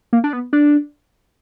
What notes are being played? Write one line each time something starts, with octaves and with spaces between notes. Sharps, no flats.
A#3
D4
B3
D4